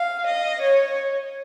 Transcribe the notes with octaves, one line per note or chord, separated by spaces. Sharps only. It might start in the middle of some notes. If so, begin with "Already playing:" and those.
Already playing: F5
D#5
C#5